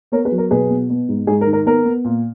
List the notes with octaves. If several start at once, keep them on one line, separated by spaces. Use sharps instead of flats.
B3 A#4 C#5
G#4 B4
F#3
A#4
B2 G#4 B4
B3
B3
G#2
G#2 G#4
A#4
D#3
A#4
B3 A#4
B3
A#2